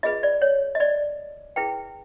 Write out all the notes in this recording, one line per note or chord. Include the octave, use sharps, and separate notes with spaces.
F4 G#4 B4 D#5
D5
C#5
D#5
D5
E4 G#4 B4 G5